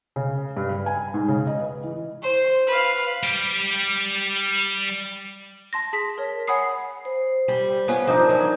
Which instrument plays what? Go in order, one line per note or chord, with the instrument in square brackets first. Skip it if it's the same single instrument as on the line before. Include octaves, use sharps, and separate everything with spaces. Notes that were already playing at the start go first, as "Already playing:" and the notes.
[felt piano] C#3
G2
B4
G#5
G#2
C#3
D#5
B4
E3
[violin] C5
B4 F5
[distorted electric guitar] G3 G4
[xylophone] A5 C6 A#6
G#4 A5 B6
A#4 C#5
C#5 F#5 G#5 B5 D#6 C7
[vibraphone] C5
[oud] G3
B3 C#4 F4
[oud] F3 [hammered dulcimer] D4 D#4 A#4
[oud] E3 F#3